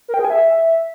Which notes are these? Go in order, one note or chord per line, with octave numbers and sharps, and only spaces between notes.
A#4
G5
G#4
G#5
E5